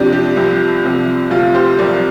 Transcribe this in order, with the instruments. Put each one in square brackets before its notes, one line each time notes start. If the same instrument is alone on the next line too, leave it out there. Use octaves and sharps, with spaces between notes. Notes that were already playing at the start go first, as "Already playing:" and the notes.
Already playing: [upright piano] F2 C3 F3 D4 G4
D4 G4
C2 C3 F3
C2 C3 F3
D2 C3 F3 F4
G4 C5
C2 A#2 F3 A#4 D5